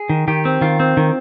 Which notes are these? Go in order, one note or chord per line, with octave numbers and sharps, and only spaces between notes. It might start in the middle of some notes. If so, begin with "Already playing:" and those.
Already playing: G#4
D#3
D#3 G4
C4
D#3 F4
C4
D#3